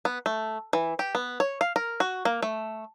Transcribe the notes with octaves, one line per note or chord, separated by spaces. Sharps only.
B3
A3
E3
G4
B3
C#5
F5
A#4
F#4
A#3
A3